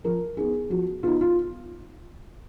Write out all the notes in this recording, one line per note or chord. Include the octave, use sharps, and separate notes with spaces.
F3 A#4
B3 D#4 G#4
F3 F#4
B3 D#4 F4
F4